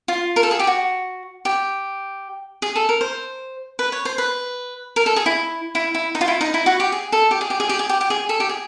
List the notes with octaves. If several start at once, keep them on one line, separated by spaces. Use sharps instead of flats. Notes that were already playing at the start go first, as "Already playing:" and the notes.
F4
A#4
A4
G#4
G4
F#4
G4
G#4
A4
A#4
C5
B4
C#5
C5
B4
A#4
A4
G#4
E4
E4
E4
D#4
F4
E4
D#4
E4
F#4
G4
G#4
A4
G4
G#4
G4
G#4
G4
G#4
G4
G4
G#4
A4
G4
G#4